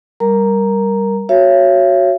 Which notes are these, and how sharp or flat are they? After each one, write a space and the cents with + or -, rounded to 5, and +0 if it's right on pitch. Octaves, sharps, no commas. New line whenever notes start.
G3 +0 A#4 +0 A#5 +0
F#4 +0 C#5 -10 E5 +45